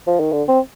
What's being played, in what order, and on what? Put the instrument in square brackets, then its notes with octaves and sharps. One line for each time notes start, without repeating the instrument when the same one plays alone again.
[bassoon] F3
D#3
D3
C4